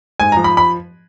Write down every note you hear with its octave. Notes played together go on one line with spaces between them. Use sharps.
G#2 G#5
F3 A#5
B5
B5